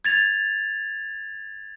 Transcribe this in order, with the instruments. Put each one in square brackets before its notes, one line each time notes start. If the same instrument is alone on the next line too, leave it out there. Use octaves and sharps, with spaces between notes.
[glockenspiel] G#6 A6 F7